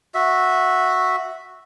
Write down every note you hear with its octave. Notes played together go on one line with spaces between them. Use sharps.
F#4 E5